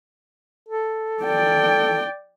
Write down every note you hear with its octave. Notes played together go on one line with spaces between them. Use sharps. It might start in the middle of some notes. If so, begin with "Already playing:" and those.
A4
D5 G5